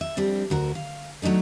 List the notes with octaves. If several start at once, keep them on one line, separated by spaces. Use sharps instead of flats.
E5
F2 G3 C4 D4
D2 F#4 A#4
F5
F#3 A3 D4 D#4 A4